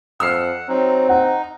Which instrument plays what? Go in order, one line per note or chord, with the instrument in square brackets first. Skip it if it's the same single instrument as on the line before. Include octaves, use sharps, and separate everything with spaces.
[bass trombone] F2 [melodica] F#5 [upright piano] E6 F6 C7
[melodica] F#3 D#4 [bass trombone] C4
[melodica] D#4 [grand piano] F#5